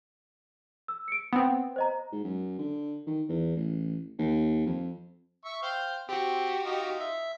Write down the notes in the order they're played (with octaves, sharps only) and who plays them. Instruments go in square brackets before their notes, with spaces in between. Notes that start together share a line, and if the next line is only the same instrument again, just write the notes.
[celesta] E6
C#7 D7
[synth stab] B3 C4
[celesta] C5 D#5 A#5
[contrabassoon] G#2
F#2
D3
D#3
E2
A1
D#2
F2
[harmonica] E5 C#6
C5 F5 G5
[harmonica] C4 [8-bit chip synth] F#4 G4
[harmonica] D#4 F4
[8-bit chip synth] E5